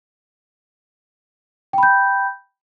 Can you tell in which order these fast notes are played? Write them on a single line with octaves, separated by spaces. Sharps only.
G5 B5 G6